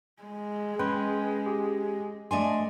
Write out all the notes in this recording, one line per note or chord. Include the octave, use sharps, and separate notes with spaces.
G#3
C#4 B4 G5 C6
G4 G#4
A3 D4 D#5 G#5 C6